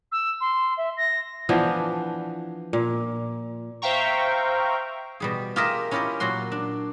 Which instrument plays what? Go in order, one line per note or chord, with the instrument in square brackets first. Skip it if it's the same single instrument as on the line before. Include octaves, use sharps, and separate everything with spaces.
[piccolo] E6
C6
E5
A#6
[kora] E3 F3 B3 D4
A#2
[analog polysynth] C5 E5 F5 G5 A#5 C#6
[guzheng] B2 G3 G#4
F4 G4 G#4 A#4 D#5 E5
C#4 E4 F4 G4 A#4 D#5
A#2 F#3 F#4 C6
D4